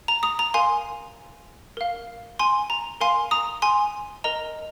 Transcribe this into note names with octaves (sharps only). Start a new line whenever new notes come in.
A#5
A#5 D#6
A#5
A#4 F5 G#5 C6
A#4 F5
G#5 C6
A#5
A#4 F5 G#5 C6
A#5 D#6
G#5 C6
A#4 D#5 A#5